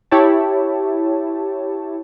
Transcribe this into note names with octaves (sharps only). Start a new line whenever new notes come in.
E4 G4 C#5 A5